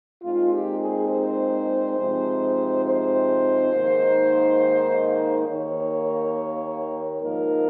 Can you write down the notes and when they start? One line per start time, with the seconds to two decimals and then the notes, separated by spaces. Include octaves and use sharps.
0.22 A#2 G#3 C4 D#4 F4
0.52 G4
0.81 G#4
1.10 C5
1.97 C3 F3 G#3 C4 D#4
2.85 C5
3.72 G#2 D#3 A#3 D#4
5.47 D#2 D#3 A#3 C#5
7.22 G#2 F3 A#3 D#4 A#4